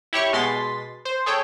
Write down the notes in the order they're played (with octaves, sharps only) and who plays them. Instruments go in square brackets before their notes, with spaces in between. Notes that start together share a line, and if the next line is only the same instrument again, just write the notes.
[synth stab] E4 G4 C#5 C#6
B2 G#3 C6 A6 B6
C5
G#4 A4 C#5 G5